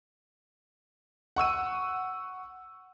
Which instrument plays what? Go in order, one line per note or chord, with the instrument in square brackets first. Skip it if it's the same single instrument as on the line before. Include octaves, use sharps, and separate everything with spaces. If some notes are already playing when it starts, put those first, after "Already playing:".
[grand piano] F#5 C#6 E6 D#7